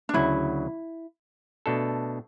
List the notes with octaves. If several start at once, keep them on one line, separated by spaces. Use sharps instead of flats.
D4
D2 C#3 F#3 E4
B2 A3 D4 A4